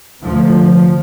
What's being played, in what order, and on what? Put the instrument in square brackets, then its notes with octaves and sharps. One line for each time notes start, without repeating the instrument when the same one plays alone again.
[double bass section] D2 C3 F3